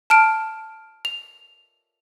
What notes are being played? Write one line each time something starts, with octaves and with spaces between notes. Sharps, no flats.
A5 F6 D7
F7